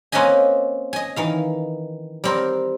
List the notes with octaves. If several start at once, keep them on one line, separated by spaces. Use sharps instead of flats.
A#3 C4 C#4 B4 D#5 G#5
D#5 G#5
D#3 E3 F5
G3 C4 A#4